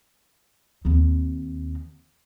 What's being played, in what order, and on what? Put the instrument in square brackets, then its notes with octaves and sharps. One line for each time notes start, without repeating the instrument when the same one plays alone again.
[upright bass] D#2 C4